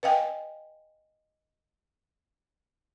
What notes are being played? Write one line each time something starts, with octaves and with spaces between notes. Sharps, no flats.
B4 D#5 F5 G5 G#5